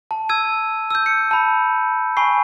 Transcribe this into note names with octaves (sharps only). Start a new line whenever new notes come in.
A5
E6 G#6 D#7
E6 G6
C#7
A5 B5
G#5 B5 C#6 C7